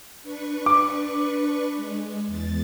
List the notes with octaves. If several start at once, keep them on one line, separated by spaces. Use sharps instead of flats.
D4 B4 C#6
D6
G#3
E2 A6